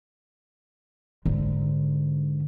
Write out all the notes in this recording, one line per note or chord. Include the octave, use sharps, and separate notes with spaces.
G#2 D3